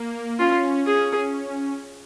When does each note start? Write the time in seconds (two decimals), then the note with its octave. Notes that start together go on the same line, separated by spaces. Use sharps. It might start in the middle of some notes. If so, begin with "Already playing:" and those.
Already playing: A#3
0.39 C#4 F4
0.87 C#4 G#4